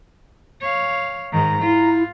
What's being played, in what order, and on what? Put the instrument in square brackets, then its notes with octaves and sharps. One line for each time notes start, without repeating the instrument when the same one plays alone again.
[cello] C#5 F5
[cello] G#2 D#3 [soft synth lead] A#5
[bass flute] E4 [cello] F4